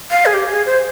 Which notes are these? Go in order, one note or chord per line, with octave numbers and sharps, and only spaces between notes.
F5
G#4
G4
G#4
C5